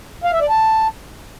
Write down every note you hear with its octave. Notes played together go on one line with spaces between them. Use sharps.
F5
E5
D5
A5